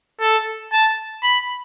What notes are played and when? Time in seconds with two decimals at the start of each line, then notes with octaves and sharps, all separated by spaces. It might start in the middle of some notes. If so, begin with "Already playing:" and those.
0.22 A4
0.72 A5
1.23 B5